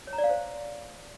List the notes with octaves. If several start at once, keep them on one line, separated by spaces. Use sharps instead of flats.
C#5
A#5
D5
F5
C5